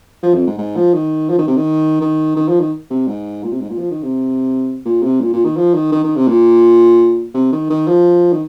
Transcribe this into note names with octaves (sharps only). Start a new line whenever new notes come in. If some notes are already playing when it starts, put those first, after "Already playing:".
F3
F2
G#2
G#2
F3
D#3
F3
D#3
C3
D#3
D#3
D#3
F3
D#3
C3
G#2
A#2
C3
G#2
A#2
F3
D#3
C3
A#2
C3
A#2
A#2
D#3
F3
D#3
D#3
D#3
C3
A#2
C3
D#3
D#3
F3
D#3